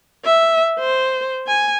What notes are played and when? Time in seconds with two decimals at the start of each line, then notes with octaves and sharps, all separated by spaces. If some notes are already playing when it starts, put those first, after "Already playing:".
0.25 E5
0.79 C5
1.47 G#5